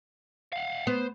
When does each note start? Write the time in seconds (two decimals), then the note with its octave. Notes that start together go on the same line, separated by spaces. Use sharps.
0.53 F5 F#5
0.87 B3 C5